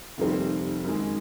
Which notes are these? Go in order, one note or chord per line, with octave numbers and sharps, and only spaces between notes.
F1 D#2 D#3 G3 C4
F#2 D#3 G#3